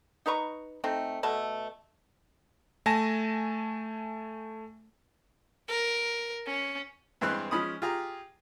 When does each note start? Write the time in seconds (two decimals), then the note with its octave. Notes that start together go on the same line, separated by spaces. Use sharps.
0.26 D#4 B4 A#5 C#6
0.84 A3 C4 D#4
1.23 B2 A3 A5
2.86 A3 G#5 A5 A#6
5.68 A#4
6.47 C#4
7.21 G2 E3 G#3 C4 C6 F#6
7.51 F3 G#3 C#4 B5 D#6
7.82 F4 G4 G#4 A#5